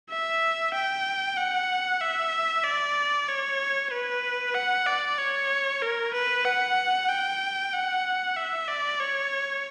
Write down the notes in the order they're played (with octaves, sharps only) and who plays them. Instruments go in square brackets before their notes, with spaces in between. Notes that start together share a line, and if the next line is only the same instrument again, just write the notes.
[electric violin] E5
G5
F#5
E5
D5
C#5
B4
F#5
D5
C#5
A#4
B4
F#5
G5
F#5
E5
D5
C#5